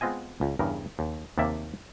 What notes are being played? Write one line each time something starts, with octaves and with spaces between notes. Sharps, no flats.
G#3 B3 C4 F4 D#5 G#5
C#2
E2 G2 C#3 A#4
D#2
D#2 C3 A#3 D5 E5